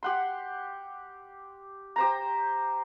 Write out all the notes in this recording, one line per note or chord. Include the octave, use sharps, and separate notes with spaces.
G4 F#5 C6
G4 C5 A#5